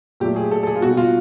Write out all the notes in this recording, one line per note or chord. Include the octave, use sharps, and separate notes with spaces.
A#2 F#3 A3 G4
G#4
A4
A4
G#4
F4
B2 G3 F#4
F4